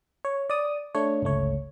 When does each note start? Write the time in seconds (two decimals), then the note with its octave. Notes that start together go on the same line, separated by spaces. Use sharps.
0.25 C#5
0.50 D5 D#6
0.95 A3 D4 C#5
1.22 G1 C#2 A3 C#5